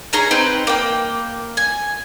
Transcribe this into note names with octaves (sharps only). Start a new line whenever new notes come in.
C#4 D#4 G#4 A#5
C4 D#4 B4
A#3 G5
G#5